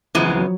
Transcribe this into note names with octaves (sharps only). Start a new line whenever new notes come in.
F#2 C#3 E3 F3 G#3 B3
F3
F#3